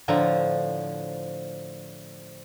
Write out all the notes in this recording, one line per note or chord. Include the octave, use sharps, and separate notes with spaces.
A2 D3 F3 A#5